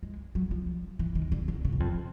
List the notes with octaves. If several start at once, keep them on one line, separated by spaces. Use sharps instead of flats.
G#3
F#3
F3
E3
D#3
D3
D3
C#3
A2
F2